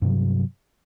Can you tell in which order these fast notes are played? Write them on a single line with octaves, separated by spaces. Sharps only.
G2 C3 F#3